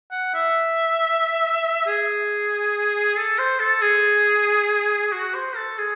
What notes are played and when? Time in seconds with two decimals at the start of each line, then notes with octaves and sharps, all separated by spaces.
0.11 F#5
0.34 E5
1.86 G#4
3.17 A4
3.38 C5
3.59 A4
3.81 G#4
5.12 F#4
5.34 C5
5.55 A4
5.78 G#4